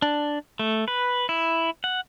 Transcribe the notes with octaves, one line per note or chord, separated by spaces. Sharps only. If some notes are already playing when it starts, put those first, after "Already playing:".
D4
A3
B4
E4
F#5